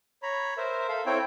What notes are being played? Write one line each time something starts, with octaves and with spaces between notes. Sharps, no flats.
C#5 A#5 B5
A#4 C5 E5
A4 E5 F5
C4 E4 A4 C#5 G5